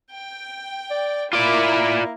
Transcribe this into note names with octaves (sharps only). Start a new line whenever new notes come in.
G5
D5
E4 F4 A#4 D5 D6
A#3